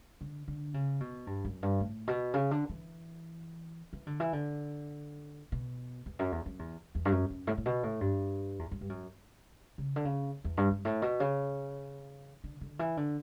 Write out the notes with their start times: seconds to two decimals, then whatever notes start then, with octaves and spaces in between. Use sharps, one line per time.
0.21 D3
0.48 D3
0.74 C#3
1.00 B2
1.27 G2
1.45 F#2
1.63 G2
1.80 A2
2.07 B2
2.34 C#3
2.51 D3
2.69 E3
3.93 E3
4.07 D3
4.20 E3
4.33 D3
5.52 B2
6.06 E2
6.19 F#2
6.32 E2
6.46 F#2
6.59 E2
6.95 E2
7.05 G2
7.12 F#2
7.30 F#2
7.47 A2
7.58 A2
7.66 B2
7.83 A2
8.01 G2
8.59 E2
8.71 F#2
8.81 G2
8.89 F#2
9.78 C#3
9.96 D3
10.05 C#3
10.44 E2
10.57 G2
10.71 G2
10.85 A2
11.02 B2
11.20 C#3
12.44 D3
12.61 D3
12.79 E3
12.97 D3